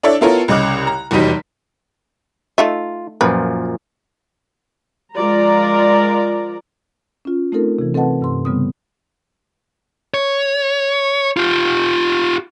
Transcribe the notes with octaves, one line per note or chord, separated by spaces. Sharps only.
D4 E4 A4 C#5 D5 E5
B3 E4 F4 A4 A#4 C#5
C2 C#3 D#5 D6 F#6
A#5
F1 E2 F#3 G3 D#4 B6
A3 D#4 F4 E5
F#2 A#2 F3 B4
F3 G#3 F4 A#4 D5 A#5
C#4 F4
A3 C4 D#4 F4 A4 A#4
C3 E3
C4 A4 B4 D#5 F#5 A5
G2 C3 C6
C#3 G3 B3 C4 D#6
C#5
F4 G4